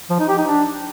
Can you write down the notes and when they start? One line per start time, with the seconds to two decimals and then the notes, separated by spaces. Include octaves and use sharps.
0.10 F3
0.19 D#4
0.28 G4
0.38 D#4
0.47 D4